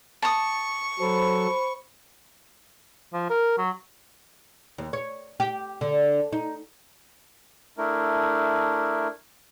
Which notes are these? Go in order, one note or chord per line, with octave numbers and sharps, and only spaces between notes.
A5 C#6 D#6
F#3 A4 C5 B5
F3
A#4
F#3
D#2
C#5
G4
D3
D#4
A3 D4 E4 A#4